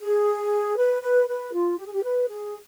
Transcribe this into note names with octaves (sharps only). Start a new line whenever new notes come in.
G#4
B4
B4
B4
F4
G4
G#4
G4
B4
G#4